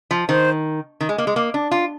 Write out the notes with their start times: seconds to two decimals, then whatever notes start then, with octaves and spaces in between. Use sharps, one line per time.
0.11 F3
0.29 D#3 C5
1.01 D#3
1.09 G#3
1.18 A#3
1.27 G#3
1.36 A#3
1.54 D4
1.71 F4